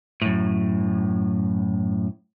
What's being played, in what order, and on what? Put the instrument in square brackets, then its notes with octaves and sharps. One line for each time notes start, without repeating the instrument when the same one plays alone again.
[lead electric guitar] F#2 A2